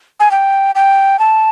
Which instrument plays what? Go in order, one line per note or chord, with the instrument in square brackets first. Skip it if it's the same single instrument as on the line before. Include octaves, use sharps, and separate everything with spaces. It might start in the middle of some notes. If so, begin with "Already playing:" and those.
[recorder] G#5
G5
G5
A5